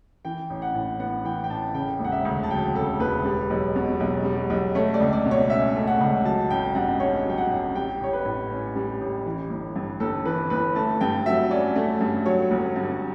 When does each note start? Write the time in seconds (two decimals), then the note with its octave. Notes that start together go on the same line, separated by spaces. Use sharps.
0.25 E3 G5
0.50 A1
0.62 F#5
0.75 A2
1.00 B3 F#5
1.25 E3 G5
1.44 G5
1.50 A1 A5
1.74 C#3 G5
2.00 E1 F#5
2.12 E5
2.25 D2
2.43 A5
2.50 F#3 G5
2.75 C#3 A4
3.00 E1 B4
3.25 G3
3.50 B1
3.76 B2
4.00 B1
4.24 G3
4.50 B1
4.75 A3 C#5
4.94 D5
5.00 C#2
5.13 D5
5.25 B2
5.31 C#5
5.50 C#4 E5
5.76 A3
5.87 F#5
6.01 C#2
6.25 F#3 A5
6.50 A1 G5
6.75 G2 F#5
7.00 C#4 C#5
7.25 F#3 G5
7.38 F#5
7.50 A1
7.75 G3 G5
8.01 A1 C#5
8.13 B4
8.25 A2
8.50 C#4
8.76 G3
9.01 A1
9.26 E3
9.50 G1
9.76 G2
10.00 G1 A4
10.25 E3 B4
10.50 G1 B4
10.76 A3 A5
11.01 G2 G5
11.26 F#3 E5
11.51 C#4 D5
11.76 A3
12.01 G2
12.26 F#3 C#5
12.51 G1
12.76 G2